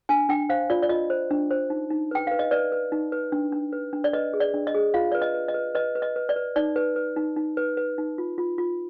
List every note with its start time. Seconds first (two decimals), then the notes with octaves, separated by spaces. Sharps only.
0.09 D4 G#5
0.29 D4 G5
0.49 C5 F5
0.70 F4 D5
0.83 D5
0.89 F4 D#5
1.10 C5
1.31 D4
1.51 C5
1.70 D#4
1.90 D#4
2.11 B4 G5
2.27 B4 F5
2.39 D#5
2.51 B4 D5
2.72 B4
2.92 D#4
3.12 B4
3.32 D4
3.52 D4
3.73 B4
3.93 D4
4.04 D5
4.13 B4 D#5
4.34 G#4
4.40 D5
4.54 D4
4.67 D#5
4.75 G#4
4.94 F4 F5
5.12 B4 D5
5.22 D#5
5.34 B4
5.48 D#5
5.54 B4
5.75 B4 D#5
5.95 B4
6.02 D#5
6.16 B4
6.29 D5
6.36 B4
6.56 D#4 D5
6.76 B4
6.96 B4
7.17 D#4
7.36 D#4
7.57 B4
7.77 B4
7.98 D#4
8.18 F4
8.38 F4
8.58 F4